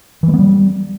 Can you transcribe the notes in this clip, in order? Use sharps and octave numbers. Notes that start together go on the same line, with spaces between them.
E3
A3
B3
G3